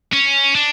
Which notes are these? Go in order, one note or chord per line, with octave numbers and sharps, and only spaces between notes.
C#4
D4